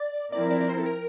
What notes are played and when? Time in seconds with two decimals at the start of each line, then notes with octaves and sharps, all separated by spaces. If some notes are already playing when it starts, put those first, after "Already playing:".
Already playing: D5
0.32 F3 C4 E4 A#4 D5
0.51 D5
0.61 D5
0.69 C5
0.79 A4
0.86 A#4